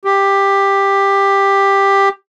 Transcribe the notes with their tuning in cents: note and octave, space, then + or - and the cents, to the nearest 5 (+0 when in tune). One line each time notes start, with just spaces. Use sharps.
G4 +10